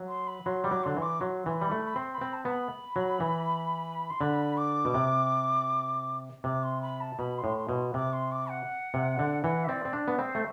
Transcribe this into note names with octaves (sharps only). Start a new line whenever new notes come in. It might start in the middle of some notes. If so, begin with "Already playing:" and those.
Already playing: F#3
C6
B5
F#3 C6
G3 D6
F#3
D3 C6
E3
D6
F#3 C6
E3
C6
G3 B5
A3
B5
C4 C6
B5
C4
A5
B3 A5
B5
F#3
E3
C6
D3 B5
D6
B2
C3
C3 D6
C6
B5
A5
B2 B5
C6
A2
C6
B2
C3 D6
C6
D6
F#5
C3
D3
E3 F#5
E5
C4 D5
C4
D4
B3
C4 C5
A3